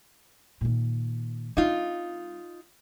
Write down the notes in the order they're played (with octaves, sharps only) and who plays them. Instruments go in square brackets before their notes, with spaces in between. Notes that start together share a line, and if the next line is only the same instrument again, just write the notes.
[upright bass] A#2 D#3
[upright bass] G3 C4 [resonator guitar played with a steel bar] D#4 F4